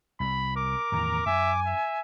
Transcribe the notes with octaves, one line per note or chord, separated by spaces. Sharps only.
C2 B5
A#4 D6
E2 A2 D#3 A#5
F#2 E5 G#5
E5